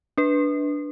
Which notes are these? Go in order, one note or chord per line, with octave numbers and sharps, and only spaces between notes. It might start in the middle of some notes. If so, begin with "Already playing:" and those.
D4 B4